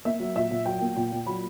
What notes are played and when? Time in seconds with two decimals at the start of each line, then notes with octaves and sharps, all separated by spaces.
0.05 A#3 E5
0.20 F#3
0.36 A#2 E5
0.51 A#2
0.66 F#3 G5
0.81 A#3
0.96 A#2
1.12 A#2
1.26 F#3 B5